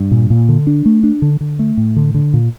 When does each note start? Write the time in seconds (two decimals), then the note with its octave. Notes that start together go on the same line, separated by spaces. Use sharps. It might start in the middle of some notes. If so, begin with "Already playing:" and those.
Already playing: G2
0.11 A#2
0.30 A#2
0.49 D3
0.67 D4
0.86 A3
1.03 D4
1.22 D3
1.41 D3
1.59 A3
1.77 A2
1.96 D3
2.15 D3
2.34 A#2